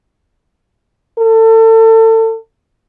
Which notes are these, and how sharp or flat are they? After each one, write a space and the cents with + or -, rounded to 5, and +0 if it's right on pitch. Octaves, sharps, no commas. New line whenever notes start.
A4 +30